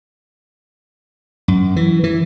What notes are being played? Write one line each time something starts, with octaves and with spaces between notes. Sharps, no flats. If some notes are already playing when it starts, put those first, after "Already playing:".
F#2
E3
E3